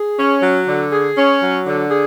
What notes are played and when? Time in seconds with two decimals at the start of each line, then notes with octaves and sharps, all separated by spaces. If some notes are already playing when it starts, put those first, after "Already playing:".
Already playing: G#4
0.18 C#4
0.42 F#3
0.67 D3
0.92 G#4
1.17 C#4
1.41 F#3
1.66 D3
1.90 G#4